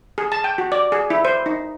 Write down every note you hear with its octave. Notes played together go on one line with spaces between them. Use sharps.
G#4
A5
G5
F#4
D5
G#4
E4
C5
D#4